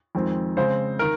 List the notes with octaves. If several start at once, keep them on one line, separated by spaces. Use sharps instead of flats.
F2 D#3 G#3 C4
C#3 G#3 C4 C5
D#3 A#4